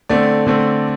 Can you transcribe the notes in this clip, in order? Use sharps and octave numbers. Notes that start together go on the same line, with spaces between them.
D3 A3 C4 D5
D3 A3 C4